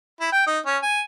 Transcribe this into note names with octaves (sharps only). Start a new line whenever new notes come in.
E4
G5
D#4
C#4
G#5